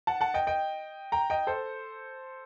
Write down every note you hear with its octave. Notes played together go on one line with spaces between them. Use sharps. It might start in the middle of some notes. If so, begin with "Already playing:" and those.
F#5 A5
F#5 A5
D#5 G5
D#5 G5
G5 A#5
D#5 G5
A4 C5